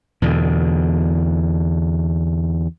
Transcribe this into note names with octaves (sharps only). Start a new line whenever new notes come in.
E2 B2 D3